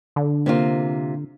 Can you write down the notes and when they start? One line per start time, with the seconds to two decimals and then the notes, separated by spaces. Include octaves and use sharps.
0.16 D3
0.46 C3 A#3 F4